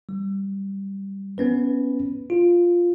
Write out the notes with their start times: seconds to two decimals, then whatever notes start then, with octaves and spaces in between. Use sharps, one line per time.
0.09 G3
1.38 B3 C#4 B4
2.30 F4